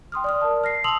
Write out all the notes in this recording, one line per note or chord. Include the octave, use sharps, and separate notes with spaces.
G5 C6 D#6 F6
D5 D#6 F6
A#4 D5 A5
F6 A#6 C7
A5 C6 D#6 E6 F7 F#7